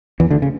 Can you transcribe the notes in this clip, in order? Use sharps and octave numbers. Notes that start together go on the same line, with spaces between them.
E2 E3
D2 D3
C#3